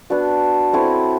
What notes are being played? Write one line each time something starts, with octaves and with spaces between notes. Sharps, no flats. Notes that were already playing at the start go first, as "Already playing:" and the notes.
B3 D4 F#4
C4 E4 A4 C#5